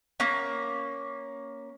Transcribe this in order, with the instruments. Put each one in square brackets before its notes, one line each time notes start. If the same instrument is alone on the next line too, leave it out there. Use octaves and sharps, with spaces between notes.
[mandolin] A#3 C#4